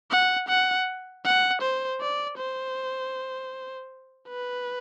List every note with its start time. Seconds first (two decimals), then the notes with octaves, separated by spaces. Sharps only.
0.11 F#5
0.48 F#5
1.25 F#5
1.62 C5
2.01 D5
2.38 C5
4.29 B4